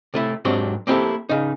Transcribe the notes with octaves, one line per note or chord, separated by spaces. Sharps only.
C3 A3 E4
G#2 F#3 C4 D4 G4
A#3 C4 D#4 E4 G4 A4
C#3 D#4